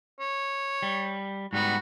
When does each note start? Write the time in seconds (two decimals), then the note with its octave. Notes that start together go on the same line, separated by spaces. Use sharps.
0.20 C#5
0.82 G3
1.53 G#2 G3 B3 F#4